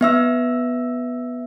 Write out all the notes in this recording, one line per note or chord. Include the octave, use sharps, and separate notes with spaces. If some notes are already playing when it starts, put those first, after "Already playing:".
B3 E5 E6